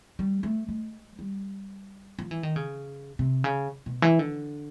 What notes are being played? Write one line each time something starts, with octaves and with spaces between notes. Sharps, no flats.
G3
A3
G#3
G3
F3
E3
D#3
C#3
C3
C#3
B2
E3
D3